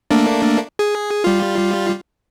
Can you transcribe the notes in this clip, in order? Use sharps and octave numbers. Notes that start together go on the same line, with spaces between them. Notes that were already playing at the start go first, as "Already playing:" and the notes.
A3 A#3 D4
G#4
G3 F4